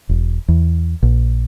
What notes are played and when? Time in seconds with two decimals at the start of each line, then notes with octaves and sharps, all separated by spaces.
0.09 E1
0.48 E2
1.03 A#1